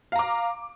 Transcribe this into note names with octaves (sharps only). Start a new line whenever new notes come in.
F5 A#5 D6